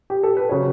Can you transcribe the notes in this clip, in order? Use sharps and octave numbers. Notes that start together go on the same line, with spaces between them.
G4
A4
B4
C#3 F#3 C#4 C#5